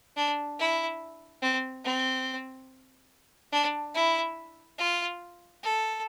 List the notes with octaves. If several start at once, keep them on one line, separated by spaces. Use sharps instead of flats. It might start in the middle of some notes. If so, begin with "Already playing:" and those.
D4
E4
C4
C4
D4
E4
F4
A4